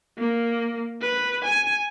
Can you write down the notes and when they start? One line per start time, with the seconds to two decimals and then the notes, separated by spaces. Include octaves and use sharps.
0.18 A#3
1.01 B4
1.45 G#5